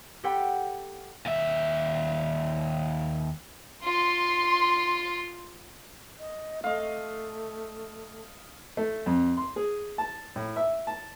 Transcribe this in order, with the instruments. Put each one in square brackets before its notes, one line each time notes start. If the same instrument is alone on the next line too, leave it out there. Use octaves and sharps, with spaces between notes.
[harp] G4 A4 F#5 G5 B5
[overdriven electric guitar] D#2 E5
[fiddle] F4 [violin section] C6
[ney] D#5
[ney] A3 [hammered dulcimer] D#5 F5
[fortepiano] A3
F2
C6
G#4
A5
A2
E5
A5